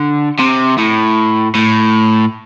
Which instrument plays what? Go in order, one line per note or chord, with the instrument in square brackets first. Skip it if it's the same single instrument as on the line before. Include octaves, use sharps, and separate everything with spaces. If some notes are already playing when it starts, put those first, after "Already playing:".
Already playing: [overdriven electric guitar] D3
C3
A2
A2